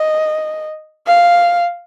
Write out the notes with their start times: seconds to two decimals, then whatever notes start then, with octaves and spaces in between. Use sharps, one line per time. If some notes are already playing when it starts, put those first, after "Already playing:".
Already playing: D#5
1.07 F5